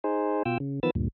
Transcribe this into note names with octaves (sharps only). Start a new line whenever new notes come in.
D#4 G#4 C5
B2 F4 G5 E6
C#3
D#3 F3 B3 B4 E6 A6
D2 G2 A#2